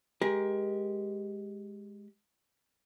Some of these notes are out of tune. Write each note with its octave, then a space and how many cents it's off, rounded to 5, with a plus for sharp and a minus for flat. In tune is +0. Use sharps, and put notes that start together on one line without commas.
G#3 +0 G4 +5 A#4 +25